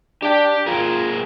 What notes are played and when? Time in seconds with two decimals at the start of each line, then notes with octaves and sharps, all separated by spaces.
0.22 D4 G4 G5
0.67 A#3 F4 G#4 A#4